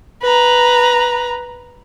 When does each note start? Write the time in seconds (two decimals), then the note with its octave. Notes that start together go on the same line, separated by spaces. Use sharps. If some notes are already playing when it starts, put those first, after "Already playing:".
0.23 B4 A#5